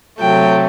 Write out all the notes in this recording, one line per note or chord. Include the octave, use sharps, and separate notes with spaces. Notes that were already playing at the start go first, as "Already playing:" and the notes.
C3 F#3 A3 G5